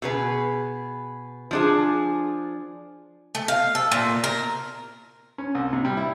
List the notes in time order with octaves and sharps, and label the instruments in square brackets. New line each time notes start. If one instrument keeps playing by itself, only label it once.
[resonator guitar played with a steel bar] B2 G#4 B4
F3 D4 G#4
[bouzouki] A3
F5
A4
A#2
A#4
[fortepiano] C#4
C2
C3
G3
E4